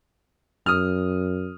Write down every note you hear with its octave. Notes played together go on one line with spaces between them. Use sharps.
F#2 D#6 F6